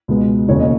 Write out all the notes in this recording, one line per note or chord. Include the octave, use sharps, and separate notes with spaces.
C#2 B2 G#3 B3
E1 D#2 C#3 C#5
D#5